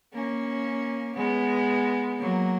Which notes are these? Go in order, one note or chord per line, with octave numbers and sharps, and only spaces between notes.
A#3 C#4
G#3 B3
F#3 A#3